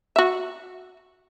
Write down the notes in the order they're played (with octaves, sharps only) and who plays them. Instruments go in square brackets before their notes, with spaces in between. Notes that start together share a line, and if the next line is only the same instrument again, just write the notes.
[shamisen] F#4 E5